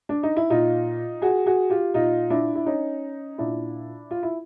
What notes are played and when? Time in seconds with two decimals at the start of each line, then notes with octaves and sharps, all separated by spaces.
0.09 D4
0.23 D#4
0.36 E4
0.50 A#2 D#4 F4
1.22 F#4 G#4
1.46 F#4 G#4
1.70 F4 G4
1.94 A#2 D#4 F4
2.30 D4 E4
2.55 E4
2.66 C#4 D#4
3.38 A#2 D4 E4
4.11 F4
4.23 E4